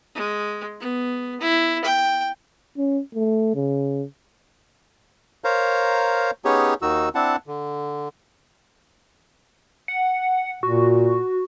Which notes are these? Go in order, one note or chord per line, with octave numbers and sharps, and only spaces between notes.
G#3
B3
E4
G5
C#4
A3
C#3
A#4 C5 C#5 F5 A#5
B3 C#4 D#4 G4 G#4 C#5
D#2 D#3 D#4 F#4 E6
C4 D4 E4 F#5 A5
D3
F#5
A#2 F#4